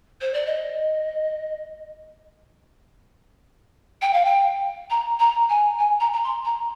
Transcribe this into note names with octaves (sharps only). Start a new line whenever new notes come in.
C5
D5
D#5
G5
F5
G5
A#5
A#5
G#5
G#5
A#5
A#5
C6
A#5